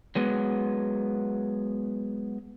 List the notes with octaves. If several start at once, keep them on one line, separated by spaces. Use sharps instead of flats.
F#3 G#3 B3